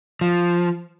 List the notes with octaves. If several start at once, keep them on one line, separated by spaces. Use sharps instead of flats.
F3